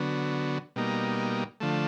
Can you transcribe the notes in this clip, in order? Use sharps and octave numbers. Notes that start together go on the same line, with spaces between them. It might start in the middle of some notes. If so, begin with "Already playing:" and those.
Already playing: D3 F#3 B3
B2 G3 A#3 D#4
D3 F3 A3